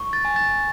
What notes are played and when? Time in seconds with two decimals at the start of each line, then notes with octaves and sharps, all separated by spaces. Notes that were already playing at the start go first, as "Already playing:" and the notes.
Already playing: C#6
0.13 A6
0.25 G#5
0.36 A6